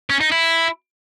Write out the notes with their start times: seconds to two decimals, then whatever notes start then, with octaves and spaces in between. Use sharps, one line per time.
0.10 C#4
0.21 D#4
0.32 E4